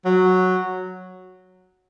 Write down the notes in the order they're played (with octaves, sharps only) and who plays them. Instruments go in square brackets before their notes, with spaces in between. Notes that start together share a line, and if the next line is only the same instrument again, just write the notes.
[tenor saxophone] F#3